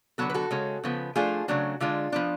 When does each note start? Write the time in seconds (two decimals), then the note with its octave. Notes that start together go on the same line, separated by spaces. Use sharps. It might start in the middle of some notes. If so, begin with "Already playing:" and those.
0.18 D3 F#3 B3 F#4 A4
0.30 B4
0.34 F#4 A4
0.51 C#3 G#3 C#4
0.84 C#3 F3 B3
1.15 F3 A3 D4 F4 G#4
1.48 C#3 F#3 A3 D4 F#4
1.80 D3 G#3 D4 F4
2.12 F3 B3 D4